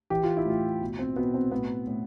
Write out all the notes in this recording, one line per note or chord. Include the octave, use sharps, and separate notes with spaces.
E3 G4
F4
E4
A2 F4
B2
C4
B2 B3
C4
A2 B3
A2